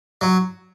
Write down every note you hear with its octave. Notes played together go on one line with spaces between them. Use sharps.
F#3